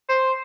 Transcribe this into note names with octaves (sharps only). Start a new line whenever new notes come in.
C5